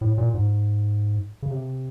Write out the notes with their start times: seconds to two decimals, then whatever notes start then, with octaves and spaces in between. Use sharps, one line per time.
0.01 A2
0.18 A#2
0.34 G#2
1.42 C#3
1.50 C3